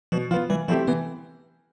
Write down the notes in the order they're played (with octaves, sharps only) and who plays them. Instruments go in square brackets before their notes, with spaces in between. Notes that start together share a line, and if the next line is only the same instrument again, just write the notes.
[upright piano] B2 [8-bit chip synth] F3
[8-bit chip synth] F3 [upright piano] F4
[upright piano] B3
[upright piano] E3 [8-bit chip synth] G3
[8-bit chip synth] F3 [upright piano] A3 C4 E4 G4
[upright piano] E3 [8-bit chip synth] B3